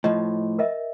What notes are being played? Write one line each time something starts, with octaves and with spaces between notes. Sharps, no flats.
A2 F3 D#5
A#4 D#5 E5